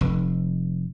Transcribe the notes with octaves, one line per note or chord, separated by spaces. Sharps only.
F1